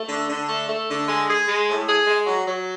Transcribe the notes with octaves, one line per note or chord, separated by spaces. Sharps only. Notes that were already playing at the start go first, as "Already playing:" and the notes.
Already playing: A3
D3
D3
A3
A3
D3
G#3
G#4
G#3
A2
G#4
G#3
F#3
F#3